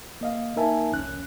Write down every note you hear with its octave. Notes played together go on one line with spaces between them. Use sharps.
A#3 D#5 F5
A#3 D#4 A#4 E5 G#5 A5
C2 F2 C#4 F#6